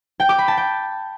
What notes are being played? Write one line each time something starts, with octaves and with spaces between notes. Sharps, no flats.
G5
D6
B5
A5
G5